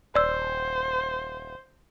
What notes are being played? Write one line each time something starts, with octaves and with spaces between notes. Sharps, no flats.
D#1 C5 D5 E6